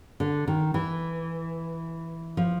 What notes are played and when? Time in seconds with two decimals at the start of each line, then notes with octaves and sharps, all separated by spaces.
0.20 D3
0.48 D#3
0.74 E3
2.37 F3